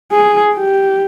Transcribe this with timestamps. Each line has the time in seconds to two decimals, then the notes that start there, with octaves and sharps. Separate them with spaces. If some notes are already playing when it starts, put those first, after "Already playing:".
0.12 G#4
0.54 G4